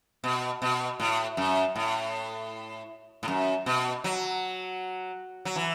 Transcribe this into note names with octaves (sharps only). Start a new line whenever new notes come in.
B2
B2
A2
F#2
A2
A2
F#2
B2
F#3
F#3
E3